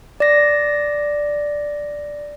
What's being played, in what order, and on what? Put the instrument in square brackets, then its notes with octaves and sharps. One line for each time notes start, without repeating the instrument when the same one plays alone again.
[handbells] D5 A#6